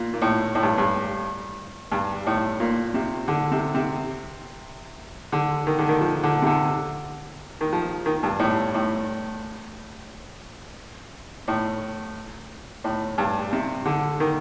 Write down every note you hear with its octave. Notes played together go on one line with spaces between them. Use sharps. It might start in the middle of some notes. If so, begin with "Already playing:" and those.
Already playing: A#2
A#2
A2
A2
G2
G2
G2
A2
A#2
C3
D3
C3
C3
D3
D#3
D3
D#3
F3
D3
C3
D3
D#3
F3
D#3
G2
A2
A2
A2
A2
G2
C3
D3
D#3